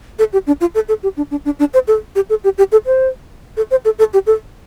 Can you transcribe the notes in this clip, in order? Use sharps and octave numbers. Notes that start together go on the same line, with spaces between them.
A4
G4
D4
F4
A4
A4
G4
D4
D4
D4
D4
C5
A4
G4
A4
G4
G4
A4
C5
A4
C5
A4
A4
G4
A4